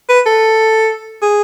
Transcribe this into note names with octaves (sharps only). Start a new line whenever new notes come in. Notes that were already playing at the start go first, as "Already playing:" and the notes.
B4
A4
G#4